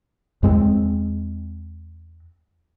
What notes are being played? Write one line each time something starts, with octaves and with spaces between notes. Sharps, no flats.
E2 G#3 C4